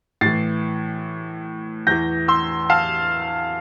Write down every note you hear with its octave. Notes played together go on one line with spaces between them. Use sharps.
A2 E3 A6 C7
E2 E3 G6 A#6
C6 E6
F5 A5